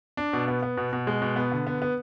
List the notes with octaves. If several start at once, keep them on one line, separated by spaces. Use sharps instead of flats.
D4
B2
B3
B3
B2
B2
G#3
B2
B3
D3
B3
B3